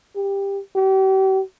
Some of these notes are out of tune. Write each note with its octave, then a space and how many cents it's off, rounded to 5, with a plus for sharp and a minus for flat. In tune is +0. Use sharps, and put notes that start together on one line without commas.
G4 +15
G4 -40